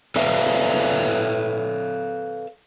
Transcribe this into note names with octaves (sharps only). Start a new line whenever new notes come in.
A4 B4 C#5 E5 F5